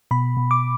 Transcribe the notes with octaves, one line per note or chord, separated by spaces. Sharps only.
B2 B5
B2
D6